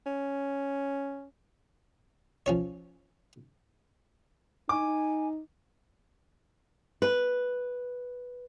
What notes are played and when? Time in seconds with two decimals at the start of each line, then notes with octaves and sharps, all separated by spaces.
0.06 C#4
2.46 F3 C#4 C#5
4.69 D#4 G#5 D6
7.02 B4